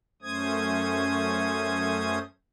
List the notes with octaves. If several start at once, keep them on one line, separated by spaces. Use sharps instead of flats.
F#2 A3 C#4 C5 D#6 G#6